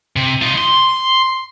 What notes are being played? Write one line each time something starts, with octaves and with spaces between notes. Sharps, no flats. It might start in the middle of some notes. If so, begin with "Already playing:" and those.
C3
D#4 F4
C6